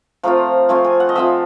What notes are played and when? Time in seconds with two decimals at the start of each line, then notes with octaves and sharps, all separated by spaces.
0.23 F3 A3 C4 F4 A#5
0.69 F3 A3 C4 F4 G#5
0.84 G#5
1.00 F#5
1.09 D#5
1.15 F3 A3 C4 F4 E5